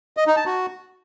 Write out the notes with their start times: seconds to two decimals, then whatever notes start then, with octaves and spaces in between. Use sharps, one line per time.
0.17 D#5
0.27 D#4
0.36 A5
0.46 F#4